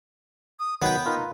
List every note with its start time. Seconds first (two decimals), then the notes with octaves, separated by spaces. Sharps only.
0.59 D#6
0.82 D#3 F#3 B3 B4 G5
1.06 D#4 F4 A#4 B4